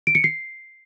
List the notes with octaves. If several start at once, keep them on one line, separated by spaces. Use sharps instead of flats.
D7
C#7
C7